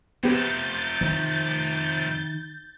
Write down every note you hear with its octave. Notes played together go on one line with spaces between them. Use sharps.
F2 C3 B3 G4 G6 A6
D#3